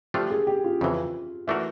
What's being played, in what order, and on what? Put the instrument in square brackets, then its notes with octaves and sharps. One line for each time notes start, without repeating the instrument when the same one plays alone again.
[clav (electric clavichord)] F3 A3 D4 F4 [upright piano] G4
[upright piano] G#4
G4
F4
[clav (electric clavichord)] F2 C#3 E3
[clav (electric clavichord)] E3 A3 D4 F#4 A#4 [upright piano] E4